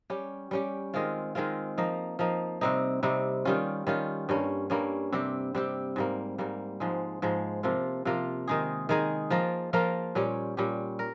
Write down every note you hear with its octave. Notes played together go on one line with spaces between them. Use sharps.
G3 C#4 G4
G3 C#4 G4
D#3 G#3 C4 F4
D#3 G#3 C4 F4
F3 A#3 D#4
F3 A#3 D#4
C3 G3 C4 D#4
C3 G3 C4 D#4
D#3 G3 C#4 F4
D#3 G3 C#4 F4
G2 G3 A#3 C#4
G2 G3 A#3 C#4
C3 G3 C4 G4
C3 G3 C4 G4
G#2 G3 A#3
G#2 G3 A#3
G#2 F3 G#3
G#2 F3 G#3
C3 F3 A#3 F4
C3 F3 A#3 F4
D#3 G#3 D#4 G#4
D#3 G#3 D#4 G#4
F3 A#3 F4 A#4
F3 A#3 F4 A#4
A#2 G3 C#4 G4
A#2 G3 C#4 G4
A#4